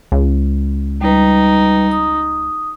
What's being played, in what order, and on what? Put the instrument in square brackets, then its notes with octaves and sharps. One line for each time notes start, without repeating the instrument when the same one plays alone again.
[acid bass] C#2
[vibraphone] G3 B4 [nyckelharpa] D#4
[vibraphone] D#6